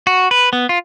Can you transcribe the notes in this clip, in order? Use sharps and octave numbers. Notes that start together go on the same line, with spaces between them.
F#4
B4
B3
F4